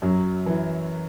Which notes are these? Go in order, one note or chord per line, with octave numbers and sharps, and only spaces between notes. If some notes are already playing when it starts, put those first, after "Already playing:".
F#2 F#3
E3